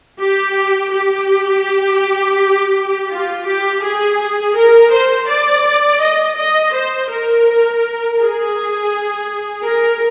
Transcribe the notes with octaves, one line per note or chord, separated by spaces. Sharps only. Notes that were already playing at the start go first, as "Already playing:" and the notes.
G4
G4
F4
G4
G#4
A#4
C5
D5
D#5
D#5
C5
A#4
G#4
A#4